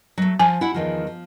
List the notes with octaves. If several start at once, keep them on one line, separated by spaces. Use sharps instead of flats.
F#3 A3
F3 G#5
E4 F#5
E2 D#3 F3
F3